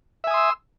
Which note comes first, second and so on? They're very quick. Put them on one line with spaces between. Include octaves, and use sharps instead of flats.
E5 G#5 D#6 C6 E6